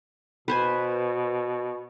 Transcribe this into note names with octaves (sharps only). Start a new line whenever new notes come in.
B2 B4 C5 G#5